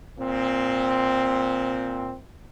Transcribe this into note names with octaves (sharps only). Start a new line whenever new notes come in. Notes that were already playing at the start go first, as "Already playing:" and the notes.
A#2 C4